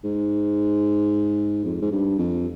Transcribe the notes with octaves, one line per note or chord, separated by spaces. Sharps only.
G#2
F2
G#2
G2
F2